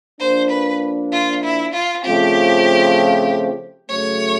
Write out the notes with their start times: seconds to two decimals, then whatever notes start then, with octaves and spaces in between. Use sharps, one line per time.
0.20 F3 A#3 D4 C5
0.50 B4
1.12 F4
1.44 E4
1.74 F4
2.05 C#3 F3 A3 C4 F4 G4
3.89 C#3 F#3 A3 C#5